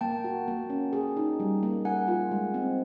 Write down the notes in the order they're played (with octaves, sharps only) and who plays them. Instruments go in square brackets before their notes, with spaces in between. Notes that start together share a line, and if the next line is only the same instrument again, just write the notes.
[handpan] A#3 [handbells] G5 A5
[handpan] F#4
A#3
C#4
G#4
D#4
G3
A#3
[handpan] A#4 [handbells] F#5 G#5
[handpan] F4
G#3
C4